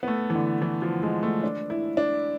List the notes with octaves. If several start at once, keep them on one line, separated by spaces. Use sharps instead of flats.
B3
A3
E3
D3
E3
F3
G#3
A3
D4
E4
D4